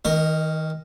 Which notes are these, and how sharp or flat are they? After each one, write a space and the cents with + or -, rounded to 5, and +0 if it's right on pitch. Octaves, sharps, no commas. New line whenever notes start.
D#3 +35 A#4 -10 D#5 +0